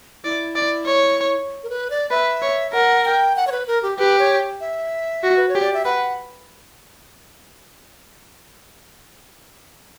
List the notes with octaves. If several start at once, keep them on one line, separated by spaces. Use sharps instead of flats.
E4 D5
D5
C#5
A#4
B4
D5
B4 E5
C#5
A#4 F#5
G5
F#5
C#5
B4
A#4
G4
G4 B4
C#5
E5
F#4
B4
C#5
G4
D5
E5
B4 F#5